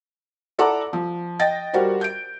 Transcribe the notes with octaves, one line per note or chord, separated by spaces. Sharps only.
E4 A4 D5 F#5 A#5 D6
F3
D#5 G5 A6 A#6
G3 F#4 A#4 C5
G6 D7